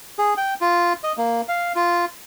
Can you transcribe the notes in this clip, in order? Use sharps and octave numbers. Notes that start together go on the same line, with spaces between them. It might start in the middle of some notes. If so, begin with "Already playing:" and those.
G#4
G5
F4
D#5
A#3
F5
F4